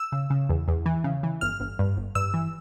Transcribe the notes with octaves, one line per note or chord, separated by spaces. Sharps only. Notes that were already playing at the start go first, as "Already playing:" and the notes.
Already playing: E6
C#3
C#3
E2
E2
E3
C#3
E3
G1 F6
G1
G2
G1
G2 E6
E3